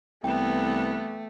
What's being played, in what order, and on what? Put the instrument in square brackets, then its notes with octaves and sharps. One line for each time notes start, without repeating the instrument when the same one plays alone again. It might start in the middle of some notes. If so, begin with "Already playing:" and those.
[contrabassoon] C2 [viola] E3 B3 [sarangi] A3 [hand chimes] G5